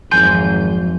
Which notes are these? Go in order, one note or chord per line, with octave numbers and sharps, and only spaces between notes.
G#1 F2 F#3 G#5 C6 G6 D#7